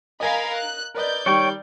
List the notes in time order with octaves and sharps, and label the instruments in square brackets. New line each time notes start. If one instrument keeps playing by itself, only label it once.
[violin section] A#4 F5 B5 [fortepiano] D#5 G#5
[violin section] F#6
[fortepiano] A#4 B4 D#5 [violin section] D5 G6
[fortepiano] D#3 G3 [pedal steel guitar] C#5 G5 C#6